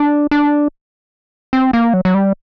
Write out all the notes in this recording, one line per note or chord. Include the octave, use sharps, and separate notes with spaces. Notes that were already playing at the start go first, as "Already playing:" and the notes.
Already playing: D4
D4
C4
A#3
F#3
F#3
G3